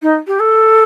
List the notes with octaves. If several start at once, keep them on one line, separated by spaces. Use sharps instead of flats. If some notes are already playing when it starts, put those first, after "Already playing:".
D#4
G4
A4